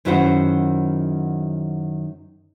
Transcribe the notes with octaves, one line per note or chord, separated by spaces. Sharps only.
F#2 D#3 E4 F#4 C5 F#5